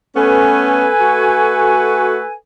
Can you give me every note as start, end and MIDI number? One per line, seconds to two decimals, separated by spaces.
0.16 0.87 57
0.16 0.87 59
0.16 0.87 61
0.16 2.32 69
0.16 2.32 71
0.16 2.32 80
1.01 2.21 57
1.01 2.21 66